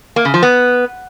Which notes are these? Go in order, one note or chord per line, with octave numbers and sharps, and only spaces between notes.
A#3
C#3
F3
B3